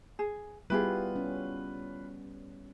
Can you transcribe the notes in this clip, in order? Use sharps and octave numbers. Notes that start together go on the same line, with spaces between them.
G#4
G3 B3 E4 F4 G4 G#4 B4
C#4